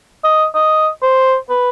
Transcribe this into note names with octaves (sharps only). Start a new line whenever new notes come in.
D#5
D#5
C5
B4